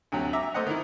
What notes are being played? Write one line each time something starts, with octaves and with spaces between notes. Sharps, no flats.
D2 C3 F#3
E5 A#5 D6 E6
A3 C5 D#5 F#5
D#3 E4